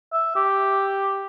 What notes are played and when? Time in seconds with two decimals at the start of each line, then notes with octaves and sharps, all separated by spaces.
0.13 E5
0.36 G4